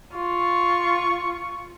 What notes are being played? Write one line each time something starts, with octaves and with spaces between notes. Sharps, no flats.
F4 C#6